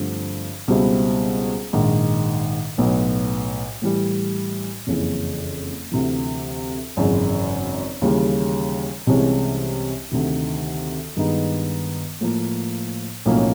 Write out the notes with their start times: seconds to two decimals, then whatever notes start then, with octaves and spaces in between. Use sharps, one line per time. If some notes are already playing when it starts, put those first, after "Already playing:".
Already playing: G2 D3 F3 A3 C4
0.68 C#2 B2 G3 C4 E4
1.73 A#1 G#2 D#3
2.78 B1 A2 F#3 B3
3.82 A2 E3 G3
4.87 F#1 F2 C#3 E3
5.91 D2 C3 E3
6.97 G#1 F#2 C#3 E3 G#3
8.01 D#2 C#3 E3 G3
9.07 C2 C3 E3 G#3 C#4
10.11 D2 C3 D#3
11.16 G2 D#3 G#3 B3 D#4
12.21 A2 F3 A#3
13.25 B1 A2 F3 A#3 C#4